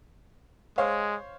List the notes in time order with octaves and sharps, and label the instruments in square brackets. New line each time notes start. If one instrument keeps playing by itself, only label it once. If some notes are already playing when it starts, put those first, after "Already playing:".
[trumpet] G#3 [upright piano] C5 C#5 F5